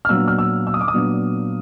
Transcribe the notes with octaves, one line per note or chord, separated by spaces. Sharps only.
F6
A#2 F#3 B3 D4 E6
F6
E6
E6
D#6
D6
D#6
A#2 F#3 B3 D4